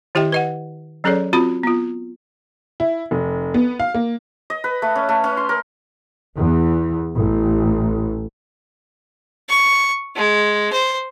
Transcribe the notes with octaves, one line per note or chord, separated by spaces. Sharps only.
D#3 E4 G4 D#5 E5 G5
B4 D#5 F#5
F#3 C#4 G#4 A4 C#5 D5
C4 F4 F#4 B5
B3 F4
E4
F1
B3
F5
A#3
D#5
B4
A3
C#4
A3
C#4
C6
A#4
E2
A1
C#6
G#3
C5